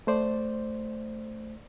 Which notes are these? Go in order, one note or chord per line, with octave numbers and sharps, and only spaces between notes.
A3 C5 D5